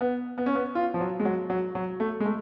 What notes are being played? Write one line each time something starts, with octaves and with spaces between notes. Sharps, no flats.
B3
B3
C#4
B3
F4
F3
F#3
G#3
F#3
F#3
F#3
A3
G#3
A3